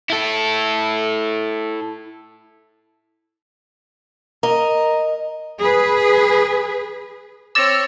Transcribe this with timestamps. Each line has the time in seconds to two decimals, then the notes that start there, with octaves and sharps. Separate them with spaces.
0.10 E4 A4
4.43 A#4 D#5
5.63 G#4 B4
7.55 C4 C#5 D6 E6 A6 A#6